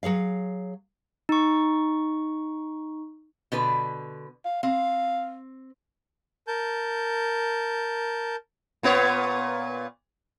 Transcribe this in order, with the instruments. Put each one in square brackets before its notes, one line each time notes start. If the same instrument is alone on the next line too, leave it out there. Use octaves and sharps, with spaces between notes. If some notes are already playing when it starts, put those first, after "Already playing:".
[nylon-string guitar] F#3 G#4 C#5 F5
[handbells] D#4 C#6
[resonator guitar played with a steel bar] B2 D3 B4
[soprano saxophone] F5
[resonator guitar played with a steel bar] C4 [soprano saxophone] F5
[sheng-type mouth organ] A#4 A5 G6
[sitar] A#2 B3 C#5